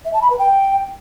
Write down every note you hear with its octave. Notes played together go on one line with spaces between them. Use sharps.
E5
A5
B5
B4
G5